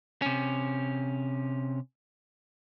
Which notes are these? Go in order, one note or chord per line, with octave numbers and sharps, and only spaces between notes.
C3 C#4